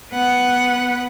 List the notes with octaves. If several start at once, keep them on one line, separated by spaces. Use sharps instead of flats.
B3 F#5